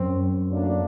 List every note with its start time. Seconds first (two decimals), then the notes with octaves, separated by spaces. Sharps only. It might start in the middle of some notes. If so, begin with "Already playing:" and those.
Already playing: F#2 C4
0.50 A2 F#3 A#3 D4